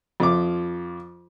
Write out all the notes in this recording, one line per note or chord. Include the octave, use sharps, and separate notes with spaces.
F2 F4 D6